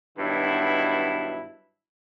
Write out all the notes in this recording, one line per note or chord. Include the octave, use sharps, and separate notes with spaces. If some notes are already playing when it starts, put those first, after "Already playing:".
G2 B2 D#3 F#3 E4